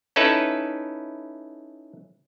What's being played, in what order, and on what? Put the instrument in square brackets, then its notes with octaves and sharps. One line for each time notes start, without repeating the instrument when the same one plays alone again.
[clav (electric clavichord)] C#4 D#4 E4 A4 B4